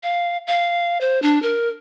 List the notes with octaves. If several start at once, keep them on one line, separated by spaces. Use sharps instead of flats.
F5
F5
C5
D4
A#4